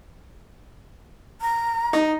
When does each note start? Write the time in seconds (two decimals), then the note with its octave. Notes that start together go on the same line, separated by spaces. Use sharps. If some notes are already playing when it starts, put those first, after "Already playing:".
1.41 A#5
1.93 D#4 D#6